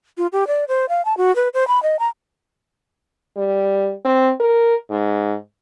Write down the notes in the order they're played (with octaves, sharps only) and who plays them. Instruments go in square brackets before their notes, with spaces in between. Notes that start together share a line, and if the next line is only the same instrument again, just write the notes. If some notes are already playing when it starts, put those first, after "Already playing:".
[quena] F4
G4
D5
C5
F5
A5
F#4
B4
C5
B5
D#5
A#5
[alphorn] G3
C4
A#4
G#2